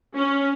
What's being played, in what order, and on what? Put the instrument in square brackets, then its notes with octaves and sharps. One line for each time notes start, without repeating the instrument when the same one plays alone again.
[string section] C#4